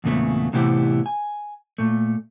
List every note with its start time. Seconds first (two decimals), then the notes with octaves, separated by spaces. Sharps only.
0.04 E2 A#2 C#3 A3 B3
0.53 A2 C3 E3 B3 E4 G4
1.06 G#5
1.78 A#2 A3